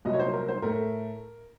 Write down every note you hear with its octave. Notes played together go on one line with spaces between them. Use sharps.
C2 A#2 F#3 D#5
C#5
C5
A#4
C5
A2 A3 A#4